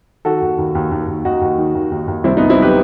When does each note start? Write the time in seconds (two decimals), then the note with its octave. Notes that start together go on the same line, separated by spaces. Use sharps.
0.25 D#3 F#4 A4
0.42 D#2
0.58 D#2
0.75 D#2
0.92 D#2
1.08 D#2
1.25 D#2 D#4 F#4
1.41 D#2
1.58 D#3
1.75 D#2
1.91 D#2
2.08 D#2
2.24 C2 C4 E4
2.37 B3 D#4
2.41 C2
2.50 C4 E4
2.58 F#3 G4 B4